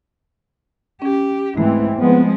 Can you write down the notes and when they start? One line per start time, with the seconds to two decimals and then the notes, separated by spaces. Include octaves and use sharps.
1.02 C#4 G4
1.57 G#2 E3 A3 C4
1.98 F3 G#3 B3 C4